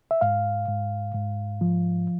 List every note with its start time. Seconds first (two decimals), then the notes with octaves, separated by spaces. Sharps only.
0.11 E5
0.21 G#2 F5
0.68 G#2
1.15 G#2
1.61 F3